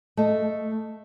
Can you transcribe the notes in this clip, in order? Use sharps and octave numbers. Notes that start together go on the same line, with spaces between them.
A3 D#5